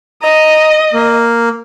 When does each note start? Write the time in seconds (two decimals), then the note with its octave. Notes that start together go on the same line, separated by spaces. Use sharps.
0.22 D#5 A#5
0.93 A#3